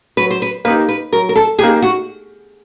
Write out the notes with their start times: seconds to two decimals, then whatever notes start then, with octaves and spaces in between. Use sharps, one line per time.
0.17 F#3 B4
0.31 C5
0.42 B4
0.65 A#3 B4
0.67 D#4 G4
0.89 B4
1.12 F#3 A#4
1.29 A#4
1.36 A4
1.59 A#3 D#4 G4 G#4
1.82 F#4